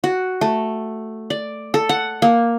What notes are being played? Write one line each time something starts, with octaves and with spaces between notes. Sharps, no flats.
F#4
A3
D5
A4
F#5
A#3